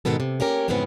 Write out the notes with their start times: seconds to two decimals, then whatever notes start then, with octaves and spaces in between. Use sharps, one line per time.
0.05 G#2 B2 D#3 B3 A4
0.20 C3
0.40 A#3 C#4 G4 A#4
0.68 F2 G#2 C#3 E3 B3 C4